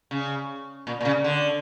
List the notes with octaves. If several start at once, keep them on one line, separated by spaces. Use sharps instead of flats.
C#3
A#2
A#2
C#3
D3